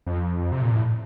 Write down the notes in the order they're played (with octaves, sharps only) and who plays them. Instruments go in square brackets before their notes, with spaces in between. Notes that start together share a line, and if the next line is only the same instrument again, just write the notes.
[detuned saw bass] F2
C3
A#2
A2